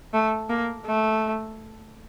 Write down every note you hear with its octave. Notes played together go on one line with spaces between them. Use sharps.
A3
A#3
A3